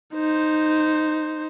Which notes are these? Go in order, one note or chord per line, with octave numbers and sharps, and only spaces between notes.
D#4 C5